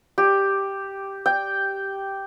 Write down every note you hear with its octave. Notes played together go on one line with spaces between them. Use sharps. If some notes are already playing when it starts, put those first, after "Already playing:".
G4
G5